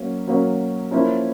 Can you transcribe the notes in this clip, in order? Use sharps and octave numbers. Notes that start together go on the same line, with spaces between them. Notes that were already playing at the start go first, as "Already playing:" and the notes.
Already playing: F#3 A#3 C#4
F#3 A#3 C#4
F3 A#3 C#4 E4